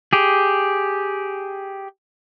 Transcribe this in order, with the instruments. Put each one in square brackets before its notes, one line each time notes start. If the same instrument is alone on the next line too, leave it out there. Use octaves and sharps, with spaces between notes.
[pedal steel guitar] G4 G#4